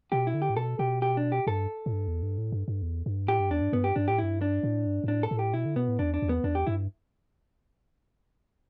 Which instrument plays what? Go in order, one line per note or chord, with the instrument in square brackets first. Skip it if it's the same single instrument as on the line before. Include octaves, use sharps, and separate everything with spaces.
[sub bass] B2 [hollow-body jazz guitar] G4
[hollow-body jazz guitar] E4
[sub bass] D3
[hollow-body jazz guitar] G4
[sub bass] A2
[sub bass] B2 [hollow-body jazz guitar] A4
[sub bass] B2 [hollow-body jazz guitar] G4
[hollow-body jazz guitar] G4
D4
G4
[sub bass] G2 [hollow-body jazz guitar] A4
[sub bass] A2
G2
E2
G2
A2
G2
G2
E2
G2
[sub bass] A2 [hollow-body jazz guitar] G4
[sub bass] G2
[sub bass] E2 [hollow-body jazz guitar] D4
[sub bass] G2
[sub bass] G2 [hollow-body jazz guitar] B3
[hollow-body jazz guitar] G4
[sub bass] G2 [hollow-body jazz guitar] D4
[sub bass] A2 [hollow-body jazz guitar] G4
[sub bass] G2 [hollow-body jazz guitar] E4
[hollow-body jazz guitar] D4
[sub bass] A2
G2
G2
[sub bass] A2 [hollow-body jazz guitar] D4
[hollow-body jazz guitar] A4
[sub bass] A2
[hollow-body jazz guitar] G4
[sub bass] B2 [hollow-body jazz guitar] E4
[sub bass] D3
[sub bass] B2 [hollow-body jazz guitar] B3
[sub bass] A2
[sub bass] E2 [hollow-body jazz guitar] D4
[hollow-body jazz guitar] D4
[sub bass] E2
[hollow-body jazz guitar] B3
[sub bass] E2 [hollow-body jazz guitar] D4
[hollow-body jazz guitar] G4
[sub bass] G2 [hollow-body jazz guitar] E4